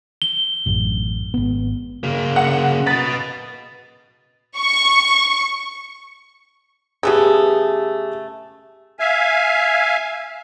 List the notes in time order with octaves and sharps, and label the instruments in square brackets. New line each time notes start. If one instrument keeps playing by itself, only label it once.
[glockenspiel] G7
[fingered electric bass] A1 F#2
G#1 B3
[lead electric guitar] C#3 A#3
[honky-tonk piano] F#5
[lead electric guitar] B4 D#5 [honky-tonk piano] A6
[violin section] C#6
[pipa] C#3 A3 B3 [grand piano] G4 G#4
[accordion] E5 F5 G#5